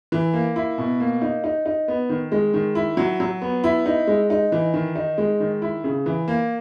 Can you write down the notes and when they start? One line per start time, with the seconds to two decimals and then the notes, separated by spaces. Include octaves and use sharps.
0.12 E3
0.33 A#3
0.56 E4
0.78 B2
1.00 A#3
1.22 D#4
1.44 D#4
1.66 D#4
1.88 B3
2.10 D#3
2.32 G#3
2.54 D#3
2.75 E4
2.97 F#3
3.20 F#3
3.42 B3
3.64 E4
3.86 D#4
4.07 G#3
4.30 D#4
4.52 E3
4.74 D#3
4.95 D#4
5.18 G#3
5.40 D#3
5.62 E4
5.84 C#3
6.06 E3
6.28 A#3